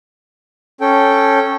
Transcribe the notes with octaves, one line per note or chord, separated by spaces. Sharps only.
C#4 A4 G5